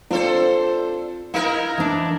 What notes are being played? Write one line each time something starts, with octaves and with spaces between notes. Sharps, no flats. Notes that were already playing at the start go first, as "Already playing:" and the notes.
C4 D4 F4 A4 C5
D#4 E4 A#4 F5
E3 D4